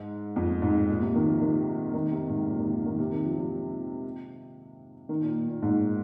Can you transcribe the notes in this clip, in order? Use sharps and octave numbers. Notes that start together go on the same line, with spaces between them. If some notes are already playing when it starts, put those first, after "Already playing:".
Already playing: G#2
F2
G#2
A#2
C3
D#3
F3
D#3
D#3
C3
G#2
A#2
D#3
D#3
D#3
C3
D#3
F3
F3
F3
D#3
A#2
A#2
G#2